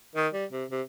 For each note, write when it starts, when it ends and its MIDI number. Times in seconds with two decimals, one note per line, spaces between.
0.16 0.28 51
0.34 0.45 55
0.52 0.64 48
0.71 0.82 48